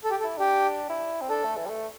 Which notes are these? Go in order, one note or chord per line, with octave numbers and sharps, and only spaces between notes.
A4
G4
A4
E4
D4 G4
E4
C4
D4 A4
A3
E3
G3
A3